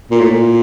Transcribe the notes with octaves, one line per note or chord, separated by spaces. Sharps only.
A#2
A2
A#2